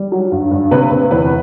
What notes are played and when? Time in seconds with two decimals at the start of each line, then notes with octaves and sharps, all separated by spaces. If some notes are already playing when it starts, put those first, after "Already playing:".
Already playing: G3
0.12 F#3
0.31 G2
0.51 G2
0.71 C3 B4
0.91 C3
1.11 E2 B4